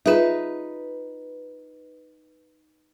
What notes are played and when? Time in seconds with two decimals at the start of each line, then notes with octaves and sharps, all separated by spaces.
0.06 D#4 F4 G#4 B4 E5